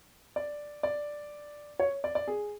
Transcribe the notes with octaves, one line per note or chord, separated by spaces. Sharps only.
D5
D5
C#5
D5
D5
G#4